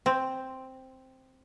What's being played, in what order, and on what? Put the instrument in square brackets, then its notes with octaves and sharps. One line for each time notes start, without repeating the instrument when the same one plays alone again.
[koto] C4